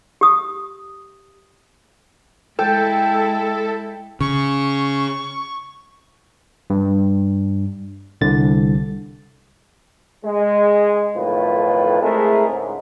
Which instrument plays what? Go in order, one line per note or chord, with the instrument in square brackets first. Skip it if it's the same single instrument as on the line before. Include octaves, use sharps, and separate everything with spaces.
[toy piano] G4 D#6
[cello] G#3 E4 [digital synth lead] A4 [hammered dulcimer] G5
[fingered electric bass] C#3 [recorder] C#6
[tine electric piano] G2
C2 D3 A6
[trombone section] G#3
B1 F2 A2 D#3 F4 B4
G#3 A3 C4 E4 G#4 A#4
C#2 G#2